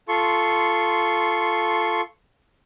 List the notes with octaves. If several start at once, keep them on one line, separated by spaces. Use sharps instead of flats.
F4 A4 C6 C#6